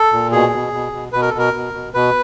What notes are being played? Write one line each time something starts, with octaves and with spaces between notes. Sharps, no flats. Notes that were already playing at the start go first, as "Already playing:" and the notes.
Already playing: A4
A#2
B2 G#4
B2
B2
B2
B2 B4
A#4
A4
B2
A#4
B2
B2
B2 B4